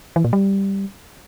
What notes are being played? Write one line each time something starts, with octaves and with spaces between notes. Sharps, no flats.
E3
A#2
G3